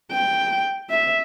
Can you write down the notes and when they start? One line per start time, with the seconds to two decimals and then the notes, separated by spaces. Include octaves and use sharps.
0.11 G5
0.90 E5